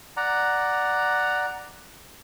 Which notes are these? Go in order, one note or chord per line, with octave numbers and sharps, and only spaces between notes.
D5 F#5 A#5